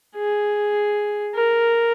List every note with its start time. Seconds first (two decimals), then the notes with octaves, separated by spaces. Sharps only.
0.16 G#4
1.34 A#4